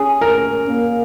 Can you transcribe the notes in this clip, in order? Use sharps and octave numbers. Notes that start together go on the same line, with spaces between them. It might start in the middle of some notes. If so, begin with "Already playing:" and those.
Already playing: C#4 G#4
A#4
A#3